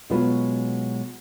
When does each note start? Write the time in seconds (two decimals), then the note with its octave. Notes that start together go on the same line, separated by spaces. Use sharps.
0.10 B2 F#3 G#3 F4 F#4 B4